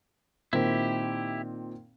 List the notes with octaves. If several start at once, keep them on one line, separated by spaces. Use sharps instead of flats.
A#2 D#3 C4 E4 G4